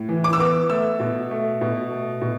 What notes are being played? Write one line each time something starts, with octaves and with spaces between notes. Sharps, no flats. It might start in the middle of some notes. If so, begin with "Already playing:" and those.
Already playing: A2
E3
D6
E6
B3 D6
A3 E6
B2
A3
B2
A3
B2